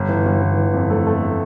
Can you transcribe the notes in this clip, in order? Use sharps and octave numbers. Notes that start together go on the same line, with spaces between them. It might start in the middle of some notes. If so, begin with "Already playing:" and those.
Already playing: G1
E3
G1
E3
E3
F2
A3
A3